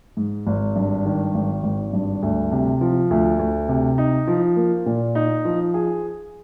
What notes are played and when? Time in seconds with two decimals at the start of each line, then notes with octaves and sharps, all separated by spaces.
0.17 G#2
0.47 G#1
0.76 G2
1.05 D#3
1.34 G#1
1.63 G#1
1.93 G2
2.22 D2
2.52 C3
2.81 F3
3.11 D2
3.39 D2
3.69 C3
3.98 D#4
4.27 F3
4.56 A#3
4.86 A#2
5.15 D#4
5.45 F3
5.74 G#4